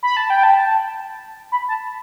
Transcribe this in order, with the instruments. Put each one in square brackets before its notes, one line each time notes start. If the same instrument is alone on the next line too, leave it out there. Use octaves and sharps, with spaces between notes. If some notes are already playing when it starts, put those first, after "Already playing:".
[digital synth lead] B5
A5
G5
A5
B5
A5